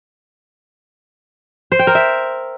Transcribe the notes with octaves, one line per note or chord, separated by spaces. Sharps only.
C5
G5
A#4
E5